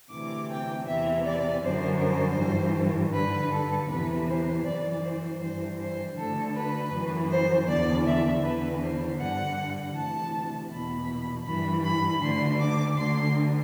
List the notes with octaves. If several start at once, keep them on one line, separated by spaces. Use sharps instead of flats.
D2 C3 E3 D6
G5
E2 C3 E3 E5
D5
F#2 D3 C5
C5
G2 E3
G2 D3 B4
A4
E2 C3 E3 B4
C5
F#2 D5
E3
C5
G2 E3 C5
C5
D2 D3 A4
B4
F#2 E3
C5
E2 D3 D5
E5
E2 D3 B4
C5
G2 D3 F#5
D2 C3 E3 A5
E2 B2 B5
G2 E3 B5
B5
D2 D3 C6
D6
D2 D3 C6